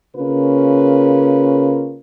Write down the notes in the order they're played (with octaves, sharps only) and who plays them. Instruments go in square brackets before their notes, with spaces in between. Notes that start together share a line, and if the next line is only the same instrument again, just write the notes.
[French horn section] C#3 A#3 C#4 F4 A#4 B4